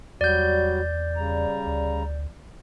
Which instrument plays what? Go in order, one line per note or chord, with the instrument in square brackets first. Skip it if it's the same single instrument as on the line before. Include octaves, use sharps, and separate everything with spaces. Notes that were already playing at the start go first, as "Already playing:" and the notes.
[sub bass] E2 [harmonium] F#3 G3 F#4 [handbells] D5 G6
[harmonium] C#3 G3 A#5
[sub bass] D2